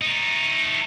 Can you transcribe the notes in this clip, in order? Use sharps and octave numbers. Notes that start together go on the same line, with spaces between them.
A3 D#4